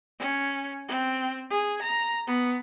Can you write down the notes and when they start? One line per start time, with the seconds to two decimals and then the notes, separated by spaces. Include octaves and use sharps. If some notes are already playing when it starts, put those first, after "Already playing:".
0.19 C#4
0.88 C4
1.50 G#4
1.82 A#5
2.27 B3